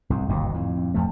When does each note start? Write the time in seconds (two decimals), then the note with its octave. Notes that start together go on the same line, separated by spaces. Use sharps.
0.10 C2 G#2
0.29 G1 D#2 B2
0.54 F2 A2
0.94 F2 F3 A3